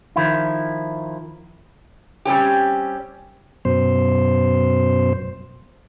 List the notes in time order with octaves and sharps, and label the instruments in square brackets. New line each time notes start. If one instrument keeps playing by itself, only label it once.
[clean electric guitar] D#3 F3 E4
[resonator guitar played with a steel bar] G3 C4 C#4 G4
[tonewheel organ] F#2 B2 C5